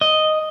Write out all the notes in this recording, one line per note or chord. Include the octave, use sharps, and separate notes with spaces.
D#5